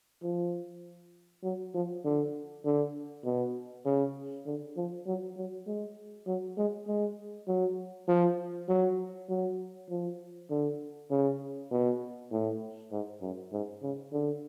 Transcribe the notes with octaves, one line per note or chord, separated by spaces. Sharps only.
F3
F#3
F3
D3
D3
B2
C#3
D3
F3
F#3
F#3
G#3
F#3
G#3
G#3
F#3
F3
F#3
F#3
F3
D3
C#3
B2
A2
G#2
F#2
G#2
C#3
D3